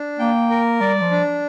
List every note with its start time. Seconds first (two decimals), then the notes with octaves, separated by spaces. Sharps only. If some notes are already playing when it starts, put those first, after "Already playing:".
Already playing: D4
0.19 A#3 G5
0.50 A#4
0.81 G3 D5
1.02 F3
1.11 D4